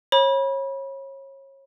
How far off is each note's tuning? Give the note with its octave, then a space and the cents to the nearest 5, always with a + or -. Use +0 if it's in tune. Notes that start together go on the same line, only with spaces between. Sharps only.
C#5 -30 B5 -30